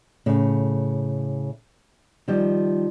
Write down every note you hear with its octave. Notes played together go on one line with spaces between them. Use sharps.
A2 C#3
D#3 F3 G3